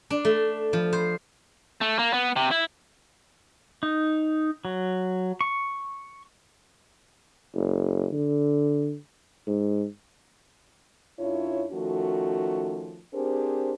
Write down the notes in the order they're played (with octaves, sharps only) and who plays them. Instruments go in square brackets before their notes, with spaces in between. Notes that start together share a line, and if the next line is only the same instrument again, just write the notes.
[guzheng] D4
A3
F3
C5
[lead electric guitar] A3
A#3
B3
C3
E4
[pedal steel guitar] D#4
F#3
C#6
[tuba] F#1
D3
G#2
[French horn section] F#2 D4 E4 F4 C#5
D#3 F3 A3 C#4 F#4
C4 D4 G4 G#4 A#4 C5